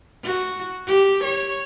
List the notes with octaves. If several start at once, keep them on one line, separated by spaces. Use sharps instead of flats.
F#4
G4
C#5